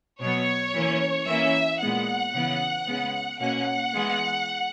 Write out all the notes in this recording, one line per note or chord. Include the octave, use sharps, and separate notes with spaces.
B2 F#3 B3 C#5
E3 A#3 C#4
E3 A#3 C#4 E5
A#2 G#3 B3 F#5
C#3 E3 B3
C#3 G#3 B3
B2 A#3 C#4 F#5
E3 G#3 B3